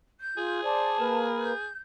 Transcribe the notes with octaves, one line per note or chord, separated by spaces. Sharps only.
G6
F4 G#4
C5 D5 A5
A#3 A#4 B4
G6